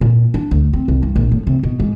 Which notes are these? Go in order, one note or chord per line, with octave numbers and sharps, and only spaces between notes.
A#2
D4
D2
C4
C2
G2
A#1
A2
C3
B2
G#2